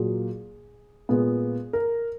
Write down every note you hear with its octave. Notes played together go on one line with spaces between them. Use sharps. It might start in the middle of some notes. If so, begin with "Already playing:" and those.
Already playing: A#2 F#3 A#3 G#4
A#2 G#3 B3 G#4
A#4